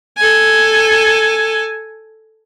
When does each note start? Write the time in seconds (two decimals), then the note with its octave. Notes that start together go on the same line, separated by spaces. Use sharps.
0.17 A4 G#5